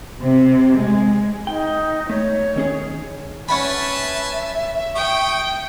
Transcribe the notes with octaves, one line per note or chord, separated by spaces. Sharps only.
C3
G#3
D#4 G5
A3 C#5
D#3 C#4 G#4
C#4 B4 E5 F#5 G#5 A5 B5
G5 C#6 D#6